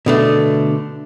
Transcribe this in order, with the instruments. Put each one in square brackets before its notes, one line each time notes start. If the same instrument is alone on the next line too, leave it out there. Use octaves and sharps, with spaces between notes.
[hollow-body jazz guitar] B2 D3 A3